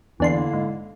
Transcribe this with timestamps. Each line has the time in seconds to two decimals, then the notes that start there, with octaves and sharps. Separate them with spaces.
0.20 E2 D3 A#3 D4 E4 C6
0.53 G#2